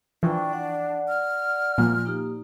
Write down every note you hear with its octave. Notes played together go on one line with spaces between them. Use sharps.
E3 F3 D4 G5 C#6
D5 F#5
F6
A#2 F3
A#3 D#4 G4